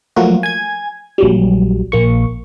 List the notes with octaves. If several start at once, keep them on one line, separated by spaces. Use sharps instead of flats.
F3 F#3 A3 A#3 F4 F#4
G#5 G#6
A#1 F#3 G3
A#1 A#3 C#6